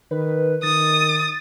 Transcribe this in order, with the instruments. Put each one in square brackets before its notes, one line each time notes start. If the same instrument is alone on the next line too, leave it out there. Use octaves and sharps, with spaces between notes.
[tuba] D#3 [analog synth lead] B4
[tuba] D#3 [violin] D#6 [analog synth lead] A6